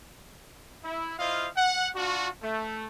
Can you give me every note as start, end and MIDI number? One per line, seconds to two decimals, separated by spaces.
0.84 1.15 64
1.19 1.48 64
1.19 1.48 65
1.19 1.48 72
1.19 1.48 75
1.19 1.48 77
1.57 1.88 78
1.95 2.28 62
1.95 2.28 65
1.95 2.28 66
2.42 2.87 57